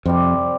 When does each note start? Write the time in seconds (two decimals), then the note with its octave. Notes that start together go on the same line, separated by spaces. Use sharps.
0.06 F2 C3 G3 C4